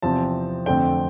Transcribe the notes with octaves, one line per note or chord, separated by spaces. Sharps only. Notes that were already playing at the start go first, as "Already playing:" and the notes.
E2 C3 F3 C4 A5
F2 D3 A3 C4 G5